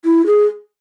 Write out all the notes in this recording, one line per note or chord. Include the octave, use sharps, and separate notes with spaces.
E4
G#4